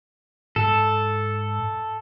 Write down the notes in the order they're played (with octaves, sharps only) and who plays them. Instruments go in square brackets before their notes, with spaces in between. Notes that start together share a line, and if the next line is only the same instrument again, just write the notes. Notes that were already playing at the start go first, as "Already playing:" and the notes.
[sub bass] G#2 [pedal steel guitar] A4